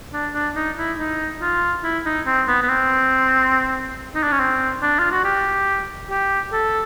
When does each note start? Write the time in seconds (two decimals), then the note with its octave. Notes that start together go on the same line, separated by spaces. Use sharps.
0.13 D4
0.34 D4
0.55 D#4
0.77 E4
0.98 D#4
1.42 F4
1.83 E4
2.05 D#4
2.26 C4
2.48 B3
2.62 B3
2.69 C4
4.15 D#4
4.23 D4
4.32 C#4
4.40 C4
4.82 D4
4.99 F4
5.12 F#4
5.24 G4
6.10 G4
6.52 A4